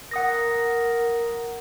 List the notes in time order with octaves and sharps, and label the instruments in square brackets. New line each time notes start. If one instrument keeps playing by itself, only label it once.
[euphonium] A#4 [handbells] F#5 D#6 A#6